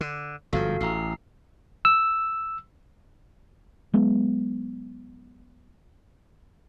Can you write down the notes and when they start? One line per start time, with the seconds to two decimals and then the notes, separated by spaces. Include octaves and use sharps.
0.01 D3
0.53 G1 G#2 F3 F#4 A4 F5
0.81 A1 A#5 E6 C7
1.85 E6
3.94 F#3 G#3 B3